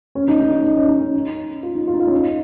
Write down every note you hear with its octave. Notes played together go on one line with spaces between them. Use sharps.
C#4
D#4
D#4
D#4
D#4
C#4
D#4
C#4
F4
D#4
F4
D#4
F4
C#4
D#4